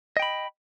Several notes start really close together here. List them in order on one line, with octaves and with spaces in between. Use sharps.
D#5 G5 B5